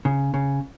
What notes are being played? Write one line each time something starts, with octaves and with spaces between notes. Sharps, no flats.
C#3
C#3